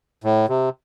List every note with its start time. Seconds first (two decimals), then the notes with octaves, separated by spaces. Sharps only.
0.24 A2
0.49 C3